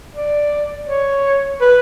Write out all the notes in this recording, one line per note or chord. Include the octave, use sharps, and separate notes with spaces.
D5
C#5
B4